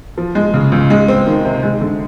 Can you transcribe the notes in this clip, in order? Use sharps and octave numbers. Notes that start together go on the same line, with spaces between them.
F3
G#3
C#3
C#2
G#3
C4
D#3
C3
G#3
D3